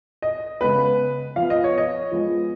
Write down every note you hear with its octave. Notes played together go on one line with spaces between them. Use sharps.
D#5
C#3 G#3 B3 B4
F3 B3 F5
D#5
C#5
D#5
F3 G#3 B3